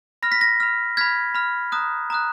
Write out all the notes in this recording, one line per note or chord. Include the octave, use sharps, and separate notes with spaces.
B5 F6 A#6
B6
A#6
B5 F6
B5 F6 G#6 B6
B5 F6
A#5 D#6 F#6
A#5 D#6 F#6